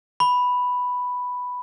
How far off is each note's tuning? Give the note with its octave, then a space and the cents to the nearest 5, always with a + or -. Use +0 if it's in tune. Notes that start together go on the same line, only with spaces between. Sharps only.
B5 +0